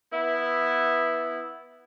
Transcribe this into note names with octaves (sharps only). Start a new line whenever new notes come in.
B3 E4